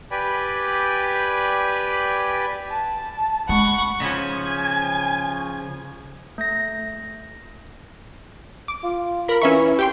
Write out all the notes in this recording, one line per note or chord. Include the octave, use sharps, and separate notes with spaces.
G4 B4 D5 G5 G#5 B5
A5
G#3 F#5 B5 C#6
C#3 F3 G#5
A3 A#6
D6
F4
A#4 B5
E3 C#4 E5 C#6
G4 G5 C6